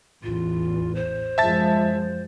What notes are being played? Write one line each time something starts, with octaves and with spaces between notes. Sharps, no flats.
A1 E2 F4
C5
F#2 F3 G#3 E5 A5 A6